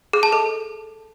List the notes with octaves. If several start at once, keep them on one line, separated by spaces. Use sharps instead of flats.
G#4
A5
A4